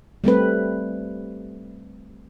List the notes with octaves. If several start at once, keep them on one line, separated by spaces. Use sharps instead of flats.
G3 A3 C4 B4